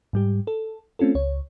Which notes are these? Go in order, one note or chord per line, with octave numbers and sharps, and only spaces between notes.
G#2 G3 G4
A4
A3 C4 C#4 F4 A4
C#2 C#5